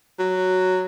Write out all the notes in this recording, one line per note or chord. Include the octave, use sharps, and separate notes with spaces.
F#3